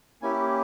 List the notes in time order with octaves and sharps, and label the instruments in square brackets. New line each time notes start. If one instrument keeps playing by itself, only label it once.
[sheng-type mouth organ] A#3 C#4 E4 G4 G#5